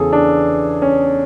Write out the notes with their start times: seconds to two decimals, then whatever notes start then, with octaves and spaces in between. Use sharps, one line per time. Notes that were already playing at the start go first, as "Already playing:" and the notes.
Already playing: E2 C#3 E3 G#4 A4
0.13 D4
0.82 C#4